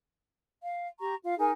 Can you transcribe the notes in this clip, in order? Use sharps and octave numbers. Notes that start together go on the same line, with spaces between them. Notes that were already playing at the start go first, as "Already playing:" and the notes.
F5
G4 A#5 C#6
F4 F5
D#4 G#4 A#4 G#5